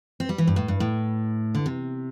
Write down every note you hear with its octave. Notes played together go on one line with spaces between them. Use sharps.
C4
G3
E3
G2
A2
G2
A2
D3
C3